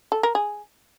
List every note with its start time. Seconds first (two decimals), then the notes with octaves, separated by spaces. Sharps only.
0.12 A4
0.23 A#4
0.35 G#4